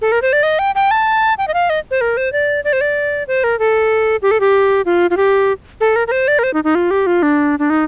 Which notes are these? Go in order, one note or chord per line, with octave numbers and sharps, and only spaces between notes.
A4
A#4
C5
D5
D#5
G5
G5
A5
G5
D#5
F5
D#5
C5
A#4
C5
D5
D5
C5
D5
C5
A#4
A4
G4
A4
G4
F4
F4
G4
A4
A#4
A#4
C5
D5
A#4
C5
D#4
D#4
F4
G4
F4
D4
D4
D#4